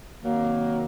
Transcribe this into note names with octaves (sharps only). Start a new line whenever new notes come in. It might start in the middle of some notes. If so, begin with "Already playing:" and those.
C3 D#3 F#3 A#3